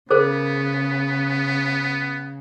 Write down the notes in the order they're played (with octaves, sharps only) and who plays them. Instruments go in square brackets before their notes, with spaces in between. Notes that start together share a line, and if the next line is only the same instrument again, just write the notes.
[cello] C#3 [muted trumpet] B3 [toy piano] G#4 A#4 C5